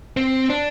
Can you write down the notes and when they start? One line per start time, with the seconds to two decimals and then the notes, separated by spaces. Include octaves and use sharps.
0.17 C4
0.49 D4